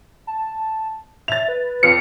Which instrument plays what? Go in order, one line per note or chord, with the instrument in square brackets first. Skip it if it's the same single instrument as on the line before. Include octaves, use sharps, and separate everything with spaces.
[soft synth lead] A5
[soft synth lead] E5 [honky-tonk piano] A6 F7
[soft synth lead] B4
[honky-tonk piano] F2 F4 C#7 [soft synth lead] B4